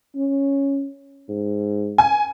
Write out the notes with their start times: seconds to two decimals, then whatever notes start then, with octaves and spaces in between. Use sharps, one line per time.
0.15 C#4
1.29 G#2
1.98 G#5